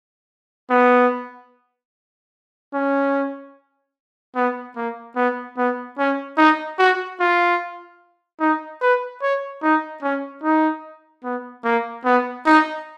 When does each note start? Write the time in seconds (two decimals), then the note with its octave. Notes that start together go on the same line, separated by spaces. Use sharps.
0.70 B3
2.74 C#4
4.36 B3
4.76 A#3
5.16 B3
5.57 B3
5.98 C#4
6.37 D#4
6.79 F#4
7.20 F4
8.40 D#4
8.81 B4
9.22 C#5
9.63 D#4
10.02 C#4
10.43 D#4
11.24 B3
11.64 A#3
12.05 B3
12.46 D#4